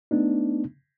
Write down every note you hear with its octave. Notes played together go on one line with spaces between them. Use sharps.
A3 B3 D4 D#4